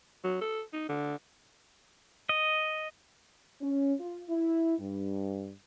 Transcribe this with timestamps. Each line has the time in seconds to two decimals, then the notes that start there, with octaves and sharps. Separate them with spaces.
0.24 F#3
0.41 A4
0.73 D#4
0.89 D3
2.29 D#5
3.62 C#4
4.00 F4
4.29 E4
4.79 G2